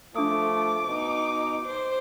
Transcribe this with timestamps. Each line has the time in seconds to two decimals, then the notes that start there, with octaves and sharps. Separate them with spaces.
0.15 F3 A3 D4 D6 D#6
0.88 B2 D#4
1.66 C5